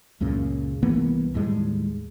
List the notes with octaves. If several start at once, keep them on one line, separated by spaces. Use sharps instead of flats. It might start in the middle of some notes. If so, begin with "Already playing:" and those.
C#2 F#2 A#2 C#3
C2 E3 A#3 B3
D#2 A2 G3 G#3